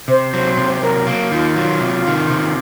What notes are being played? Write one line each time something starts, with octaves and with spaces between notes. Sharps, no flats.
C3 C5
F#3
C3
C5
F#3 A#4
A#3
D#3 F4
F#3
C3
D#3
C3